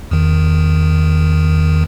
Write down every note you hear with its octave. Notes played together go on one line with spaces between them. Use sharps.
E2 D#3